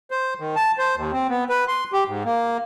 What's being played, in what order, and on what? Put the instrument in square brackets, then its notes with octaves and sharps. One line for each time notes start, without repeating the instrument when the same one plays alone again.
[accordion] C5
D#3
A5
C5
D#2
C4
B3
B4
C6
G4
G#2
A#3